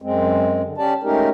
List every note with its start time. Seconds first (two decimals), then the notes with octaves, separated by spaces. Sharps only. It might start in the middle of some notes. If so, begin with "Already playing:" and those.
0.02 F#2 G#3 C4
0.64 D3
0.78 C#4 G4 D5 A5
1.03 G#3 A3 C#4 D#4 G4 A#4